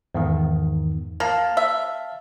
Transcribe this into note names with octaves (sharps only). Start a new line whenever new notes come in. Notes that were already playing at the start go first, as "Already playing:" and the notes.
E2 G#2 D#3
A#3 F5 A5 F6
E5